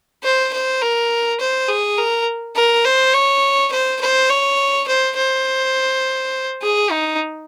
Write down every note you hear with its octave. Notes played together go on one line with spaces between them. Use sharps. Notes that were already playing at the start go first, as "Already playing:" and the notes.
C5
C5
A#4
C5
G#4
A#4
A#4
C5
C#5
C5
C5
C#5
C5
C5
G#4
D#4